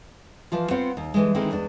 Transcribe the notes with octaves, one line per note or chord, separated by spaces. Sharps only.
E3 F3 F4
B3 C4 F4 C5 F#5
D#2
D3 E3 G#3
D#3 E3 G#3 A3 C4 D#4
E2 G#3 D4